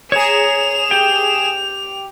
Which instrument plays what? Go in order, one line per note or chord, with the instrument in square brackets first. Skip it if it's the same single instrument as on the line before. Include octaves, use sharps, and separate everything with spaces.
[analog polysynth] G#4 E7 [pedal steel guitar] C#5 A#5 [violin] F7
[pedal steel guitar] G4 G5